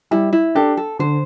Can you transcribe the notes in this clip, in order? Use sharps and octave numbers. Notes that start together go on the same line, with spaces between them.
G3 E4
E4
D4 G4 A4
A4
D3 C5